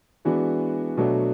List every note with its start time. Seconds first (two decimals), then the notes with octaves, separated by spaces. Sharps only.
0.25 E3 G#3 B3 D4 F#4
0.97 B2 F#3 A3 D4 F#4